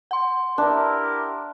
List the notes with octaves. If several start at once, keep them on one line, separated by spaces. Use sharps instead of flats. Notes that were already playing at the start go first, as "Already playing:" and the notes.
F#5 C6
D4 E4 G4 A#4